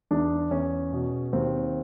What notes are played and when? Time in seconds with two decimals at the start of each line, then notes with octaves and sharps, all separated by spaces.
0.11 E2 D4
0.51 E2 C#4
0.93 B2
1.33 D#2 C4